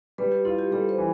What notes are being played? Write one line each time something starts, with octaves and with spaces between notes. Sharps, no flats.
G3 B4
G4
E4 F4
G4
G3 A4
C5
E3